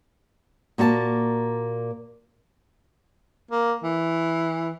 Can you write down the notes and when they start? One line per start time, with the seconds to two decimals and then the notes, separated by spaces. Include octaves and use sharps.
0.78 A#2 A#3 F#4 C5 A5
3.51 A#3
3.84 E3